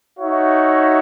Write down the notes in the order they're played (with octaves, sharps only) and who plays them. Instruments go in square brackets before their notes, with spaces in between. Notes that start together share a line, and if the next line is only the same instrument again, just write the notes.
[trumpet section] D#4 F#4 C#5 E5